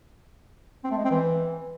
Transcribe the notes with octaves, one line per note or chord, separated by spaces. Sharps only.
C4
A3
G#3
C4
E3